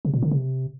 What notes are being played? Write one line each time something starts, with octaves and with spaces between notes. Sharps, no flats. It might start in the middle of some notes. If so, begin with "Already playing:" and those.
C3
A#2
D3
C3